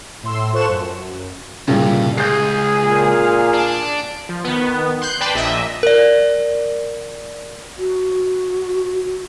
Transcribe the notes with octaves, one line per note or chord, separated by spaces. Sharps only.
A2 C6 E6
F4 A4 C5 C#6 F#6 E7
F#2
C2 G2 A#2 C#3
C#2 G#4 G6 C7
A#2 F5
D4
F3
D#3 B3
C6 F#6 G6
B4 D5 G5 A5 B5 C6
A#1 A#2 D#5 E5
A#4 D5
F#4